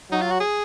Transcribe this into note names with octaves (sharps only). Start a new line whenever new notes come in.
F#3 D#4
F4
F#4
G#4